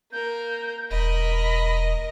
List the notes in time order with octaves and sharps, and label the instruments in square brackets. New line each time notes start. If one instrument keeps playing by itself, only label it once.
[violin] A#3 A#4 [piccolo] G6
[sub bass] E1 [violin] A#4 D#5 [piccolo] B5